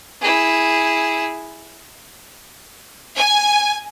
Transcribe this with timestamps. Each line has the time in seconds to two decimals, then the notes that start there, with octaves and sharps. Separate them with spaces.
0.21 E4 G#4
3.16 G#5